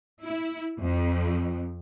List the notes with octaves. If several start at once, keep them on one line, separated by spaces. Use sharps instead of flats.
E4
F2